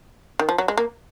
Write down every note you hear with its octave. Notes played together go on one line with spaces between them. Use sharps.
D#3
F3
F#3
G#3
A#3